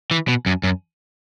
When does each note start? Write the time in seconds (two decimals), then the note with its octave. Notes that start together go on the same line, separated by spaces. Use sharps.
0.11 E3
0.28 B2
0.46 F#2
0.63 F#2